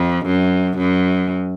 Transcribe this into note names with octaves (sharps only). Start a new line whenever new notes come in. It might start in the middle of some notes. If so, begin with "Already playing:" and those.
Already playing: F2
F#2
F#2